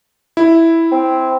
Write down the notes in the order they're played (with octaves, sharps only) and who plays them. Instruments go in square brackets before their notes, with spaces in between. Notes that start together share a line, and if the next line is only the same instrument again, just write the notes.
[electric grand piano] E4
[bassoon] C4